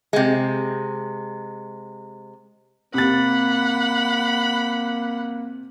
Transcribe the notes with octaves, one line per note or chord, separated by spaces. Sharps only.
C3 G#3
C3 A#3 F#5 B5 A6